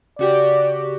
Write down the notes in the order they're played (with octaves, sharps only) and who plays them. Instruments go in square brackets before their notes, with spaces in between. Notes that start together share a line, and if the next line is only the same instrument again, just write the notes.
[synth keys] C#3 F#4 G4 [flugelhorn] D5